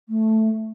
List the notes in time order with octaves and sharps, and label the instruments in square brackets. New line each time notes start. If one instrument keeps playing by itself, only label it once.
[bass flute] A3